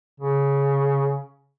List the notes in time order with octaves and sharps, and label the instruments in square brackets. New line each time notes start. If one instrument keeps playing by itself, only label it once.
[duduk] C#3